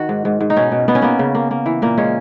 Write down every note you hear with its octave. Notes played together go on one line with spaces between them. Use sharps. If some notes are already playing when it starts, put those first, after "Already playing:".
Already playing: D#3 F#4
G#2
G#2
G#2
D#4
B2 C#4
B2
B2 B3
C#4
A#3 B3
C#3
A#3
A#3
E3
A#2 A#3
G#3 C#4